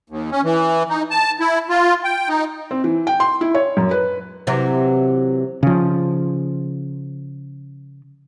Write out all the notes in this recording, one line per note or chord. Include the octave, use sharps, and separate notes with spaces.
D#2
C#4
E3
D#4
A5
E4
F4
G5
D#4
C4
E3
G5
C6
E4
C#5
F#2
B4
C3 E3 F#3
C#3 F3